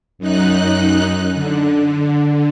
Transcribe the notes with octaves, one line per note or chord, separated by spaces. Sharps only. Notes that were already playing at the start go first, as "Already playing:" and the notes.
F#2 D#4 F#6
D3